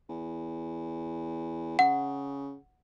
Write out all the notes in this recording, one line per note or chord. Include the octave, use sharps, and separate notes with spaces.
E2
C#3 F#5